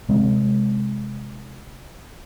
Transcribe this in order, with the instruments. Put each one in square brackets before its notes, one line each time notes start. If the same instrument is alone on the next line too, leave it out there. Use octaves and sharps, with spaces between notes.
[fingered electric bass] C3 G#3 C4